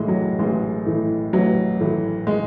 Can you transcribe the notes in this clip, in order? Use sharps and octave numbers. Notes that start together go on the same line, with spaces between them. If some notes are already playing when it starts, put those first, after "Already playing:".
Already playing: A1 A2 E3 G#3
F#3
A1 G#3
A2 E3
A1 F#3
A2 E3
G#3